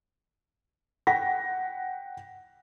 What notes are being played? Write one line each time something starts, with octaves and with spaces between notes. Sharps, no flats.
F#5 G5 A#6 B6